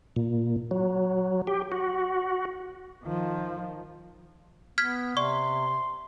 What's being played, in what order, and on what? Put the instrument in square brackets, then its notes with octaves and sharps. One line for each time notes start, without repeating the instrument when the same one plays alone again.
[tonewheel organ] A#2
F#3
G4
F#4
[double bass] D#3 F3
[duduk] B3 [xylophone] F6 G#6 B6
[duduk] C3 [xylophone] D5 C#6 [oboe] C6